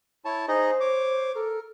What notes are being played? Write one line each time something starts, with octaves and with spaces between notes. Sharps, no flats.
E4 C#5 A5
D#4 G#4 C5 D#5
C#5 D6
A4 A#4